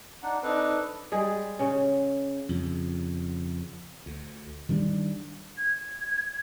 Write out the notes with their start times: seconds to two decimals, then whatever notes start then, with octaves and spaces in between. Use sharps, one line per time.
0.23 D4 D#4 F#5
0.43 C4 D4 D#4 A4 B4
1.12 G3 G#3 G#4
1.59 C#3 C#4
2.49 F2 C#3
4.06 D2
4.69 D#3 G3 D4
5.57 G#6